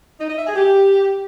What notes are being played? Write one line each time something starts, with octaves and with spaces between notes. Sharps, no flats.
D#4
D#5
E5
G#4
G4